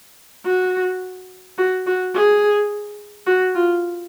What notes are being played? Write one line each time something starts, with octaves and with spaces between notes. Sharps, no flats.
F#4
F#4
F#4
G#4
F#4
F4